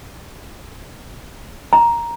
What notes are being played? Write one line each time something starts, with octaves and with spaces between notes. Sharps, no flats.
A#5